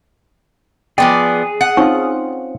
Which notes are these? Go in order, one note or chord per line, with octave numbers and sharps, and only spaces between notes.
F3 B3 G#4 D5 G5
F#5
C4 C#4 D#4 F4 C#6